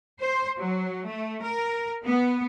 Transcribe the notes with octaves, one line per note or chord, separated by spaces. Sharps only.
C5
F#3
A3
A#4
B3